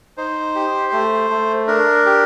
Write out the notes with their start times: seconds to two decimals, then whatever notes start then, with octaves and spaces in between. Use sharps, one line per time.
0.17 D#4 C5
0.55 G4
0.93 A3
1.30 A3
1.68 D4 A#4
2.06 G4